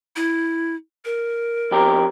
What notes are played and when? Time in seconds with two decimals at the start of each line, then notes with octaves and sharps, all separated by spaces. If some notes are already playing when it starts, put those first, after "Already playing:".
0.16 E4
1.05 A#4
1.71 F2 G4 A#5